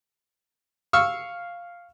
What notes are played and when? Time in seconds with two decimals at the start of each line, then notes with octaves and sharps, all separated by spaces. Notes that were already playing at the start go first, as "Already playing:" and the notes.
0.93 F5 C#6 E6 F6